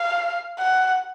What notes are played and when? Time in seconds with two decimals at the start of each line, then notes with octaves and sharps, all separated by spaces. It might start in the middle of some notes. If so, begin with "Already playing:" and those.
Already playing: F5
0.59 F#5